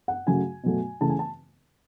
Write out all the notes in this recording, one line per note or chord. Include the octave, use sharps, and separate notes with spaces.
F#5
C#3 F#3 A3 G#5
B2 F#3 A3
C#3 E3 A3 A5
G#5
A5